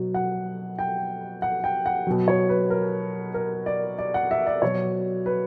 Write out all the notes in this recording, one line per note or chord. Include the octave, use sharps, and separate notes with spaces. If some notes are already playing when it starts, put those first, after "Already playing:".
Already playing: B2 F#3
F#5
G5
F#5
G5
F#5
B2 F#3
C#5
B4
A#4
A#4
D5
D5
F#5
E5
D5
B2 F#3 C#5
B4